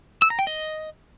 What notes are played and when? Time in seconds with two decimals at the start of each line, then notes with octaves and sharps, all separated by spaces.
0.22 E6
0.30 A#5
0.39 G5
0.47 D#5